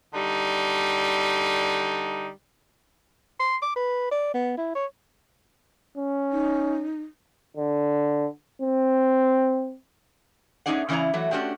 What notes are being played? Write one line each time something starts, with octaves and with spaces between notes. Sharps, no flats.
D3 G3 D#4
C6
D6
B4
D5
B3
E4
C#5
C#4
D#4
D3
C4
A3 C#4 D#4 G#4 D5 F#5
C#3 E3 C#4 E4 D5 A#5
E3 F#3 A3
A3 C#4 D4 F#4 G4